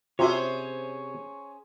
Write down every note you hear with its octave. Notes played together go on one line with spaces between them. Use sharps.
C3 C#4 F4 F#4 G#4 C5 C#5 E5